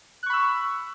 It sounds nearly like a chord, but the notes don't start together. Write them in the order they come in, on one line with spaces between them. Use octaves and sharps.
F#6 C#6 B5 E6